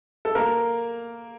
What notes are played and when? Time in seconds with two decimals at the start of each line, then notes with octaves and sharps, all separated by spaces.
0.25 A4
0.35 A#3 A#4